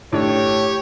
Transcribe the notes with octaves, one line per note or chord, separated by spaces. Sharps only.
A2 D4 G4 C#5